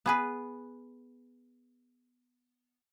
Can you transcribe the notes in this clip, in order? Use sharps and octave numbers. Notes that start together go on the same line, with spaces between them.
B3 G#4 B4